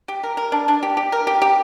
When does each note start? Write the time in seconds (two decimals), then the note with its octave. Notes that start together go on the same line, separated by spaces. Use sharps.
0.08 G4
0.23 A#4
0.37 A#4
0.52 D4
0.68 D4
0.83 G4
0.97 G4
1.12 A#4
1.27 G4
1.42 G4